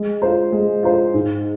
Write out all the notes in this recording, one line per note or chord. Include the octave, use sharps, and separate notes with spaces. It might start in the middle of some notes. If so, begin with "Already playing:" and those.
Already playing: G#3
F4 C5
G#3
F4 C5
G#2